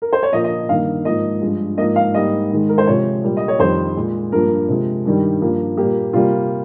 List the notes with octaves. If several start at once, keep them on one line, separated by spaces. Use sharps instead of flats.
A#4
C5
C#5
A#2 F3 A#3 D#5
D#5
G2 D#3 A#3 F5
G#2 F3 A#3 D#5
G2 F3 G#3
G#2 F3 A#3 D#5
F5
G#2 G3 A#3 D#5
G#2 D#3 G#3
A#4
C5
C3 F3 G#3 C#5
A#2 G3 A#3
D#5
C#5
F2 D#3 G3 C5
A#2 G#3
G2 F3 A#3 A#4
C3 F3 G#3
G2 D#3 G3
G2 F3 A#3
A#2 G3 A#3 G4
C3 G3 A#3 F4